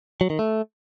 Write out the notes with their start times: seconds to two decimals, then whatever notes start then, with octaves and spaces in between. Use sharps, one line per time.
0.21 F#3
0.30 D#3
0.39 A3